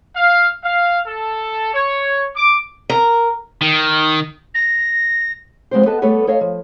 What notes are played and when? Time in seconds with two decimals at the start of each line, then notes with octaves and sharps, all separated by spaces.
0.16 F5
0.64 F5
1.07 A4
1.74 C#5
2.36 D6
2.90 A#4
3.61 D#3
4.54 A#6
5.71 F2 G#3 B3 C4 G4 C5
5.86 B3 A4 B4 D#5 A5
6.02 G2 A3 B3 A4 B4 C#5
6.27 A4 C#5 D#5 F5
6.41 F3